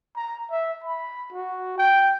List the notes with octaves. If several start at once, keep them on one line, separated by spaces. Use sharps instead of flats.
A#5
E5
B5
F#4
G5